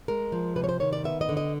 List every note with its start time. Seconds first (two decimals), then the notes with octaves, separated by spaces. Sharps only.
0.08 G#3 A#4
0.32 F3
0.56 C3 B4
0.64 C#5
0.69 C5
0.80 D#3 C#5
0.93 D5
1.04 B3 E5
1.21 D#5
1.29 D3
1.37 D#5